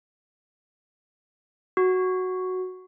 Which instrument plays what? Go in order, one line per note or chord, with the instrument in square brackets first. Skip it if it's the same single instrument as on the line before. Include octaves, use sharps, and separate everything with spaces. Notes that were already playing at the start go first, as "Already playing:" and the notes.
[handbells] F#4